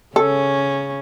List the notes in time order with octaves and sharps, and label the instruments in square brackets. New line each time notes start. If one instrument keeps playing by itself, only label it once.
[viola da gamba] C#3 C#4 [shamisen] A4